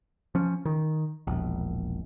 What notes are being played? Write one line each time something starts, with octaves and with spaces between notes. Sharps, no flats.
F3 C#4
D#3
E1 A#1